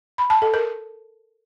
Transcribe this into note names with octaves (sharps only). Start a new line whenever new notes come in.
B5
A5
A4
A#4